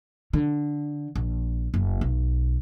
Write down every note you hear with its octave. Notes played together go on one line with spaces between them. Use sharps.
D3
A#1
F#1
B1